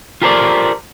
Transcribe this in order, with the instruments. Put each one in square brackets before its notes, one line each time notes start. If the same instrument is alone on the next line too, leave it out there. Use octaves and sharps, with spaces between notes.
[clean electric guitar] F4 G4 A4 A#4 C5 D5